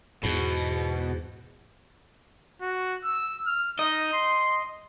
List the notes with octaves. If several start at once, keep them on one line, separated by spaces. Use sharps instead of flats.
E2 G#2 B2
F#4
E6
F6
D#4 D#5
C6